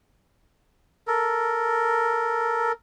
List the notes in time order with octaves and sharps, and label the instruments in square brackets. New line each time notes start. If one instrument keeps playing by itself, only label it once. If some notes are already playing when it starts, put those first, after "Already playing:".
[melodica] A4 A#4